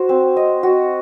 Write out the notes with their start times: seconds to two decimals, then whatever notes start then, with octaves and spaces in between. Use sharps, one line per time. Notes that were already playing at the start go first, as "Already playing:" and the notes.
Already playing: F#4 C5
0.09 C4
0.37 D#5
0.63 F#4